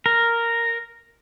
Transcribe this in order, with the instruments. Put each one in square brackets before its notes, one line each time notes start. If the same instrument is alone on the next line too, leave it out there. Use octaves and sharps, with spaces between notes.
[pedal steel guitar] A#4